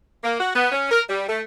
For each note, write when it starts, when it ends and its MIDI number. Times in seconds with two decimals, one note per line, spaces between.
0.24 0.38 58
0.40 0.55 66
0.55 0.71 59
0.72 0.90 61
0.91 1.02 70
1.09 1.29 55
1.29 1.41 57